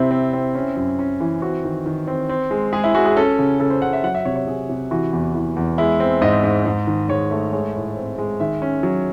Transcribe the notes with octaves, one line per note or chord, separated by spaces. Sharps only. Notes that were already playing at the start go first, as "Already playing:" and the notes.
Already playing: C3 C4 E4
C4
C4
C#4
F#2
C#4
E3
C4 F#4
D#3
D#3
C4
C4
G#3
G#3 G#4
E4
G#3 F#4
G#4
C#4 A4
C#3
C#3 A4
C5
C#3 F#5
E5
F#3 F#5
E5
C3 C#5
C#5
C3 G#4
C3
E3 F#4
E2
E3
E2
G#3 E4
C4
G#2 D#5
G#2
G#2
D#3
G#2 C#5
A3
G#3 C#5
A2
C4
G#3
D#3 E5
C#4
F#3